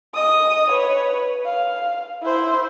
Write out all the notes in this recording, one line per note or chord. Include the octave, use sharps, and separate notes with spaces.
D#5 D#6
B4 C#5
F5
E4 C5